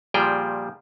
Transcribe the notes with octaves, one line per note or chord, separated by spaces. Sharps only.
A#2 F3 G3 G#4 G5